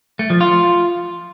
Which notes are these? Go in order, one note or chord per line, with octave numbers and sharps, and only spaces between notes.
A3
F3
F4